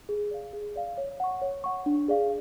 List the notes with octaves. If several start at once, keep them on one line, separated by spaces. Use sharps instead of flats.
G#4
D5 F5
G#4
D5 F5
C#5
F#5 C#6
C#5
F#5 C#6
D4
G#4 D5 F5